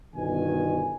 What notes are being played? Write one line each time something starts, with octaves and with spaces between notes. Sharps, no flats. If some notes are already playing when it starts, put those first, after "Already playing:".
G1 B2 D#3 G#5